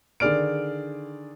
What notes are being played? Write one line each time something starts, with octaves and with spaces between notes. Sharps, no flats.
D3 D#3 G#4 D5 F6 D7